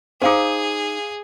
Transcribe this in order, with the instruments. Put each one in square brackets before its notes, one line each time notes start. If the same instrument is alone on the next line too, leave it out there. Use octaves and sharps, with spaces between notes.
[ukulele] C#4 D#4 [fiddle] G#4 [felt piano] C5 F5 D6